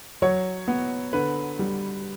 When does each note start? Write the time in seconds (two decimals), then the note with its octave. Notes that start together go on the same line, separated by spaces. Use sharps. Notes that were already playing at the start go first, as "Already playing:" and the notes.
0.22 F#3 C#5
0.68 B3
1.13 D3 B4
1.59 G3